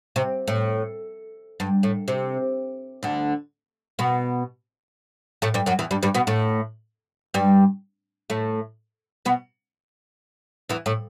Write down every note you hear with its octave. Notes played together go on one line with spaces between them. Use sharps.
C3
A2
G2
A2
C3
D2 D3
B2 B3
A2 A3
G2 G3
F#2 F#3
E2 E3
G2 G3
G2 G3
B2 B3
A2 A3
G2 G3
A2 A3
B2 B3
E2 E3
A2